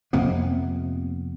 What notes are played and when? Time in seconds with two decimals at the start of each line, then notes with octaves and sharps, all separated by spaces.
0.13 F2 C3 A#3 B3